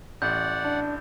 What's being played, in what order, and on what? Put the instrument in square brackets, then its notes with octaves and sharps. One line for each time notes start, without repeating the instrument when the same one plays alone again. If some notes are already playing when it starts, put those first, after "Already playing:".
[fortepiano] A1 [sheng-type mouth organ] D5 F#5 [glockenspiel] G6
[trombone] D4